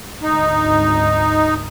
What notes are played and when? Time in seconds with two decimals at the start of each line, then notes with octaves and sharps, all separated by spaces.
0.23 G#1 D2 D#4